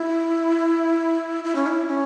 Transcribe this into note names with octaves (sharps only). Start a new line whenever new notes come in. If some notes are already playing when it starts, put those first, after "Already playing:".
Already playing: E4
E4
C#4
E4
C#4